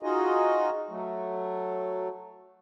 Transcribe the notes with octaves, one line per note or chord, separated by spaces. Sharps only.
D#4 F4 F#4 G#4 D#5
F#3 A3